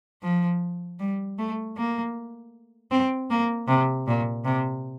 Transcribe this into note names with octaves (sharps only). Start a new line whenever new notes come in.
F3
G3
A3
A#3
C4
A#3
C3
A#2
C3